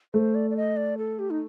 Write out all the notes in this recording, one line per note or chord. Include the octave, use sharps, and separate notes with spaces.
A3 C5
D5
D5
D#5
D5
A4
G4
D#4